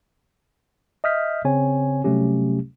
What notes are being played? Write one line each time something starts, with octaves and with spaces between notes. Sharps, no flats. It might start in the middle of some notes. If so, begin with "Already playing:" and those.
D#5 E5 D#6 F6 G6 B6
C#3 C4 C#5 G#5
C3 F#3 G3 A3 C#4 G4